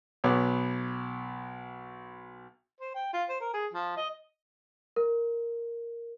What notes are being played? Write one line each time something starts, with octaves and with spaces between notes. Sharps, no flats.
B1 B3 C#5 D6
C5
G5
F4
C5
A#4
G#4
F3
D#5
A#4